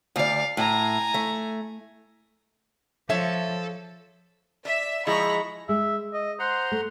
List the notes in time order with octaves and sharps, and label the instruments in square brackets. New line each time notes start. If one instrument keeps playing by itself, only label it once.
[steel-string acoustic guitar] D2 D5 [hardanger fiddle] F5
[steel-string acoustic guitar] A2 [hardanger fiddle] G#5 A#5
[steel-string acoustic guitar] A3
[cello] F3 [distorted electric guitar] A4 [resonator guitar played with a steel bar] C#5 E5
[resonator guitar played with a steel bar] D5 [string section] E5
[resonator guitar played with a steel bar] F3 E4 [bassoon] G#3 [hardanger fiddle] A#5 B5 [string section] C#6
[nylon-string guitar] G#3 [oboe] E5
[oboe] D#5
[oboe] C5 [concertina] F#5 A#5 C6
[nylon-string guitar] A3